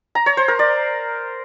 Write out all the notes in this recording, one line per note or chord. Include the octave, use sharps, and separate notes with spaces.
A#5
C#5
C5
A#4
D5